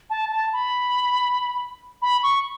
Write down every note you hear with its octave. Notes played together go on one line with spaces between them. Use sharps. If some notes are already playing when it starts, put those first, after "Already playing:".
A5
A5
B5
B5
C#6